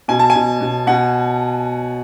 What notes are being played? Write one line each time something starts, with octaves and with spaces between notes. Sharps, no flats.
B2 G#5
A5
B2 G#5
B2
B2 F#5